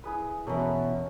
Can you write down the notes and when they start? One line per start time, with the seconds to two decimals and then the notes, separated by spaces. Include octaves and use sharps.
0.04 E4 G#4 B4
0.47 E2 B2 C#4 A4 A#4